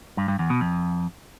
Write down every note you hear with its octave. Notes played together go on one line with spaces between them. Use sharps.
G2
G2
E2
B2
F2